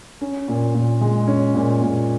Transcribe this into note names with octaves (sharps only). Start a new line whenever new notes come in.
C#4
A#2
A#2
G#3
C#4
A#2
A#2